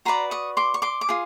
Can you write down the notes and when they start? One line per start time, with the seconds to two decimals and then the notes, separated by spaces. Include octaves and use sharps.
0.05 F#4 B4 D5 A#5 C6
0.31 C#6 D#6
0.57 C6 D6
0.74 C#6
0.82 C6 D6
1.01 D6
1.09 F4 G#4